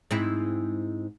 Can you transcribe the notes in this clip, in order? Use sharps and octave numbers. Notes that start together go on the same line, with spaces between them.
G#2 C4 E4